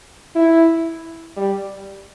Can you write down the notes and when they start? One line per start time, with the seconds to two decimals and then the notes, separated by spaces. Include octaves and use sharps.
0.35 E4
1.36 G3